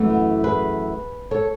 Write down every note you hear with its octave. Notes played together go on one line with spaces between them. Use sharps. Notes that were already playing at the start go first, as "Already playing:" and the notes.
Already playing: F#2 E3 A3
B3
G#4 B4
A4 C#5